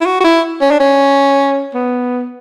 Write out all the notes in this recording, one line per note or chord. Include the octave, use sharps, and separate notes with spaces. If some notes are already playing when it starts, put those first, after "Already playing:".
E4
F#4
F#4
E4
C#4
D4
C#4
B3